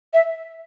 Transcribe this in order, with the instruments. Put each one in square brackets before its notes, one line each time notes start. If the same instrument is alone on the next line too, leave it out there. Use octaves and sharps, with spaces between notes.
[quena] E5